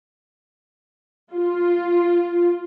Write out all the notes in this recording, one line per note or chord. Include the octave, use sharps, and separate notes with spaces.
F4